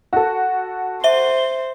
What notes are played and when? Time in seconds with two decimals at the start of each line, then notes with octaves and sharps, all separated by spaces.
0.13 F#4 A4
1.04 C5 E5 G7